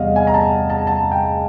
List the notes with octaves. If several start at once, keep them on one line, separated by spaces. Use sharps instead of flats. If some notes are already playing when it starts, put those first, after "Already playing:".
Already playing: E2 C3 G3 G#4 D#5 F5
G#5
A#5
A5
A5
A5
G5